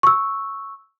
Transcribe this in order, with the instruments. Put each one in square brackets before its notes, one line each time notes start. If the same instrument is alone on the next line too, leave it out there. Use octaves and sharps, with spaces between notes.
[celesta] C#6 E6